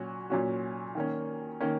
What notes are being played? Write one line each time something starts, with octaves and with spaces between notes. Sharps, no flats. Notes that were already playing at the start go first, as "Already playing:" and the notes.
Already playing: A#2 F#3 C#4 F#4
A#2 F#3 C#4 F#4
D#3 A#3 C#4
D#3 A#3 C#4